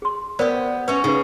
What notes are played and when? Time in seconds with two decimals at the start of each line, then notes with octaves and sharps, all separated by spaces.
0.02 G#4 C6
0.39 B3 G4 A#4 C5 D5
0.88 C#4 B4 C#5 E5
1.04 C#3 D#4 B4